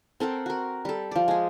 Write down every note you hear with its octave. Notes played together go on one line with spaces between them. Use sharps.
C4 A4 A#4 F#5
F#4 A#4
G3 A4
F3 D5
G#3 G#4